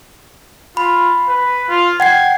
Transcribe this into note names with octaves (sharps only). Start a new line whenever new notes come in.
F4 B5
B4
F4
F#5 G5 G#6 C7